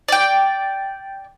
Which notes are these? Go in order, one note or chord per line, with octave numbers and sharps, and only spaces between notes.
D5 G5